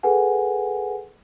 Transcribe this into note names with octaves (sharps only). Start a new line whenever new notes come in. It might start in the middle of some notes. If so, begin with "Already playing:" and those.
G#4 A4 B4 F#5 G#5